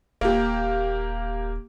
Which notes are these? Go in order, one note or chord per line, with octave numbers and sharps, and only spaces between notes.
D#1 A#3 G4